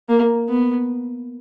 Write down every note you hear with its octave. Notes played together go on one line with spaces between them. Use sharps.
A#3
B3